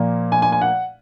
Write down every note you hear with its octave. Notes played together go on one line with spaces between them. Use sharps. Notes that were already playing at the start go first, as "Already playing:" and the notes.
Already playing: A#2 F3 A#3
G#5
G#5
G#5
F#5